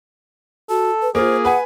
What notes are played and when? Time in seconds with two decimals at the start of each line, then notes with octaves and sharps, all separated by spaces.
0.70 F#4 A4
1.02 B4
1.15 A#3 F4 G#4 C5
1.45 B4 F#5 G#5